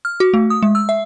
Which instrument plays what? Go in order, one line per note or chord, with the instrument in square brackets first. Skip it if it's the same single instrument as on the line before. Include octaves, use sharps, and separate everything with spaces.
[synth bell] F6
F#4
A3
D#6
G#3
E6
E5